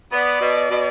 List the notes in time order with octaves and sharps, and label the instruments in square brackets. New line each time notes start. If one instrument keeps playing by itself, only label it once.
[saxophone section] B3 [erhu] D5
[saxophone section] B2
B2